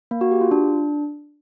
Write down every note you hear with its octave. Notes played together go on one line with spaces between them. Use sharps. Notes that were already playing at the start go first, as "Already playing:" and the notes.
A#3
F#4
G4
F4
D4